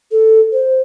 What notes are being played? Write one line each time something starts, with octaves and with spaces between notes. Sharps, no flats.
A4
C5